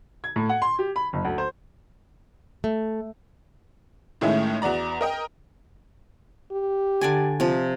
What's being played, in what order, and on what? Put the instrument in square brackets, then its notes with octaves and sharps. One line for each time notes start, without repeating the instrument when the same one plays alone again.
[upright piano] G#6
A2
F#5
C6
G4
B5
F#1
D2
C5
[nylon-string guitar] A3
[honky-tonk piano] A2 D#3 G#3 A3 C#4 E4
E2 F#4 D5 A#5
A#4 D#5 G5
[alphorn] G4
[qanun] D3 D5 G#5
C3 F3